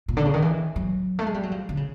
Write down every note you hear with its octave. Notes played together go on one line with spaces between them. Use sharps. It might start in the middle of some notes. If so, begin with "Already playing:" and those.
A#2
D3
C#3
D#3
E3
F#3
A3
G#3
G3
F#3
F3
D3
C#3